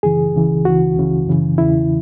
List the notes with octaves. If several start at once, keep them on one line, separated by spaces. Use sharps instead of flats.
F#2 C#3 E3 G#4
C#2 C#3 E3
C#2 C#3 E3 F#4
C#2 C#3 E3
F#2 C#3 E3
E2 C#3 E3 E4